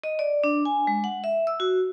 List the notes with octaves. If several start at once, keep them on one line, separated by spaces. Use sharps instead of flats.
D#5
D5
D4
G#5
G#3
F#5
E5
E6
F#4